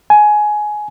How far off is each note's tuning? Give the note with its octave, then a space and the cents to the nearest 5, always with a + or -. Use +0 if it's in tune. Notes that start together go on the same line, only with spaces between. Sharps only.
G#5 +15